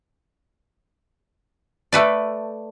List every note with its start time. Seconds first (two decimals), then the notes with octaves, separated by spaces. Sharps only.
1.92 A3 B4 D5